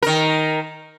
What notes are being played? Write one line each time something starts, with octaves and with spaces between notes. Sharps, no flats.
D#3 A#4